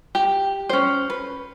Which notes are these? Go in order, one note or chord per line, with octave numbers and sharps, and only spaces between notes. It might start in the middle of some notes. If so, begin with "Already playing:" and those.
G4
C#4 C5
B4